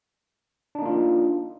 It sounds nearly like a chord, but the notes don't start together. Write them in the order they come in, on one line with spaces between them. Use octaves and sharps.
D4 D#4 A#3 F4